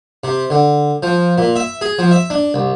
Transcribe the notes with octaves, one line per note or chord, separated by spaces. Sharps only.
C3
D3
F3
A#2
E5
G#4
F3
E5
D4
C2